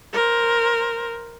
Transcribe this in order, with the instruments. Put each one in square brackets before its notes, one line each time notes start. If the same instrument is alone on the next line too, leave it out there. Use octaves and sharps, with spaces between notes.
[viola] A#4 C5